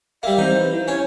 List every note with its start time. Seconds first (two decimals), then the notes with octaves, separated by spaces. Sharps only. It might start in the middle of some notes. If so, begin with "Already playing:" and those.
0.23 G3 A#3 E5
0.38 E3 C4 D#4 C5
0.60 B4
0.73 E4
0.88 C#4 C#5